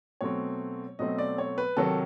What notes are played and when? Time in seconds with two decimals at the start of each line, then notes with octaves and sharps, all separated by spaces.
0.21 B2 F#3 A3 C4 C#5
0.99 B2 F#3 A3 C4 D#5
1.18 D5
1.38 C#5
1.58 B4
1.77 C3 D#3 F#3 A4